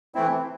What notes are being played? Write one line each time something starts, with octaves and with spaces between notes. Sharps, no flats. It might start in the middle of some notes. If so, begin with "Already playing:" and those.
E3 A3 C4 E4